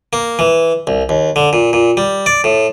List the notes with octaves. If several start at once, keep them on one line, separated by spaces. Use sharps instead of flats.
A#3
E3
C2
D#2
D3
A#2
A#2
G3
D5
A2